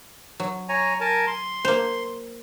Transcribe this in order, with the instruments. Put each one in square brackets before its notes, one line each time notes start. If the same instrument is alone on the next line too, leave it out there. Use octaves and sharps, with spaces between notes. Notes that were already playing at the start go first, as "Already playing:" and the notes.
[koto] F#3
[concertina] C#5 G#5 A#5
A#4 G#5 A5
C6
[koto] A#3 C5